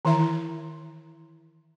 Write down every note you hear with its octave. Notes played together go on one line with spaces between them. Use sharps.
D#3 E3 E4 E5 A#5
E4